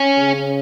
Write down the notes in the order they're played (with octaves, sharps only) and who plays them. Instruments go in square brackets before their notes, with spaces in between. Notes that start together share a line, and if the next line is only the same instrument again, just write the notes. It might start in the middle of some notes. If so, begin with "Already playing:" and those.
Already playing: [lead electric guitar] C#4
[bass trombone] C#3